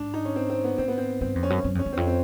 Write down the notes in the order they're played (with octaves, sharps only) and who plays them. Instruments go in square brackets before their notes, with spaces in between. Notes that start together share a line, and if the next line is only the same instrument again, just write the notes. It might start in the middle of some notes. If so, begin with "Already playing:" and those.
Already playing: [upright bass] G#2 [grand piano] D4
[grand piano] D#4
C#4
C4
C4
B3
[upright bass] G#2 [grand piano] C4
[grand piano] B3
C4
[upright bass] G2 [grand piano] C4
[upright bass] F2
[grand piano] C#4
[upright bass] F#2
F#2
[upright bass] F2 [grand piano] C#4
[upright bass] E2
[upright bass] F2 [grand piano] C4
[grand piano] C4